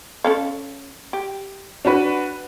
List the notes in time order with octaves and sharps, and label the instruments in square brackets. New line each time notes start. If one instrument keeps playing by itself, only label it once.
[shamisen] C#4 A4 F5
G4
[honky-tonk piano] D4 F#4 B4